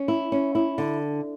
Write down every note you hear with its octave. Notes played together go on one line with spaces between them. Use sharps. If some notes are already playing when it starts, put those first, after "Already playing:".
Already playing: C#4
E4
C#4
E4
D3